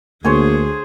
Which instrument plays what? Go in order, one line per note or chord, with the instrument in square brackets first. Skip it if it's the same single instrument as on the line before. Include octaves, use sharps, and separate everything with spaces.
[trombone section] D2 [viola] D3 G#4 [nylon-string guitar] A#3 [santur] C5 C#5 G#5